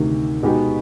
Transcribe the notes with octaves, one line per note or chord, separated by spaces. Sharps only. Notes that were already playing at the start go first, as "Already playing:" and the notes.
Already playing: D2 C3 D#3
B2 G#3 B3 D#4 G4